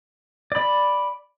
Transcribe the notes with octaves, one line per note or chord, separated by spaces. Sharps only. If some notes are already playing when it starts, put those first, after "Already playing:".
D5 B5